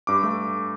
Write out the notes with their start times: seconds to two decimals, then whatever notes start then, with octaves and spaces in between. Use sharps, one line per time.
0.07 G2 D6
0.24 A3